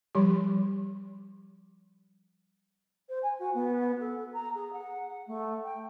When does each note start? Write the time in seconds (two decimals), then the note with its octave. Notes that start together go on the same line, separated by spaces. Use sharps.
0.15 F3 G3 G4
3.09 C5
3.23 G#5
3.39 F#4
3.54 B3
4.00 A4
4.33 A#5
4.54 G#4
4.73 F#5
5.27 A3
5.64 G5